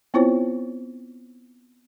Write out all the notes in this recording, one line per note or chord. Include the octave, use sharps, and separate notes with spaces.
B3 C4 E4 F4 C5 C#5